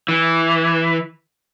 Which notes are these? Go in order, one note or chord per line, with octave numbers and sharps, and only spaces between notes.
E3